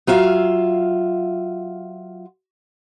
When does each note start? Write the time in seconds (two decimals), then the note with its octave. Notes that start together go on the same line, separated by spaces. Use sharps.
0.07 F#3 F4 E5 F5